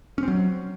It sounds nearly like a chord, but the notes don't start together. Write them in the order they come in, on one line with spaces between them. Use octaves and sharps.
C#4 C4 F#3